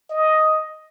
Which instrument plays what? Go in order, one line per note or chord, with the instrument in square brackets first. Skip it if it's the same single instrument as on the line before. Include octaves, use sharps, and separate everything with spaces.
[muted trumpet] D#5